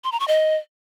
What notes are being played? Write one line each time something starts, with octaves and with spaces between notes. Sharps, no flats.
C6
A#5
C#6
D#5